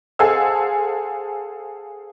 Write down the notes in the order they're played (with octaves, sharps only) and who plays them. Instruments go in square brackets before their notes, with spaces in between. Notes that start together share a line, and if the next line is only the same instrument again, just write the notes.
[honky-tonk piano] G#4 A4 C5 F5 F#5 E6